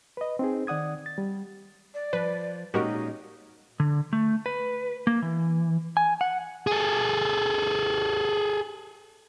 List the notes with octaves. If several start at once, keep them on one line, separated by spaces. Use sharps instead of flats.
B4 D#5
C4 D#4 G#4
D#3 D5 F#5 D#6 G#6
A6
G3
D5
F3 B4
A#2 G#3 C#4 D#4 F#4 G4 A#4
D3
A3
B4
A#3
E3
G#5
F#5
G#4 A4